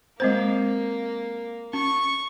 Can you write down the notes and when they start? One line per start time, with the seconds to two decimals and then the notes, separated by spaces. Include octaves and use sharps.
0.20 G#3 A#3 C4 C5
1.73 C#4 C#6